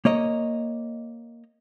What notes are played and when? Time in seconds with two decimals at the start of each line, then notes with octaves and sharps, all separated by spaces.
0.05 A#3 C#5 D#5